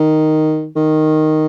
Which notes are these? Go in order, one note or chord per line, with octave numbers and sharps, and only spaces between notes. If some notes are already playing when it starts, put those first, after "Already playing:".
Already playing: D#3
D#3